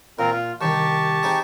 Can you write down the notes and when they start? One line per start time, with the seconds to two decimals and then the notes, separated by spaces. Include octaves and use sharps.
0.19 A#2 C4 F4 A#4
0.33 F4
0.61 C2 D#3 G4 A5 C#6
1.23 C4 D#4 G#4